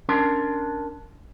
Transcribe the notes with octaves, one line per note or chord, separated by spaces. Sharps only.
C#4 D4 A#4 A5 C6